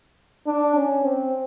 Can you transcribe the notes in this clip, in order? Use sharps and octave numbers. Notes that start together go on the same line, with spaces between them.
D4
C#4
C4